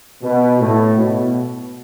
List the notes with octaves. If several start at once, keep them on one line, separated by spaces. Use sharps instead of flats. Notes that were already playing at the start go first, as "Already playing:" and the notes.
B2
A2
B2